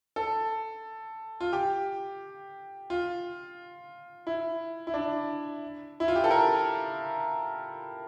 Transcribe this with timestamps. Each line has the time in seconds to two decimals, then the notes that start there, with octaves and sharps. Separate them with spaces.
0.16 A4
1.40 F4
1.53 G4
2.90 F4
4.27 E4
4.87 E4
4.94 D4
6.00 E4
6.08 F4
6.15 G4
6.24 A4
6.31 A#4